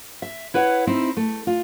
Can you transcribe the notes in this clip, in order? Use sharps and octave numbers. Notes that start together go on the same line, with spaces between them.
E5
E4 B4 C#5 F#5
C4 D#4 E4
A3
F4